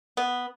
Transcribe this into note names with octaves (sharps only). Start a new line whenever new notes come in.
B3